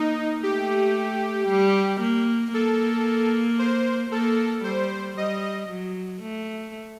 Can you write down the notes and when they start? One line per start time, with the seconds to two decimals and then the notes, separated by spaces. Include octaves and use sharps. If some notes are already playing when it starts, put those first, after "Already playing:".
Already playing: A#3 D#4
0.43 A3 G4
1.48 G3
2.01 A#3
2.53 A#3 A4
3.59 C5
4.11 A#3 A4
4.64 G3 C5
5.17 G3 D#5
5.69 F#3
6.22 A3